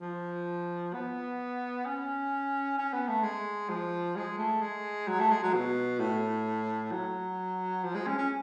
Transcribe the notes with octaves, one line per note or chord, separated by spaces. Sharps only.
F3
B3
C#4
C#4
B3
A3
G#3
F3
G#3
A3
G#3
F#3
A3
G#3
F#3
B2
A2
F#3
F3
G#3
C#4
C#4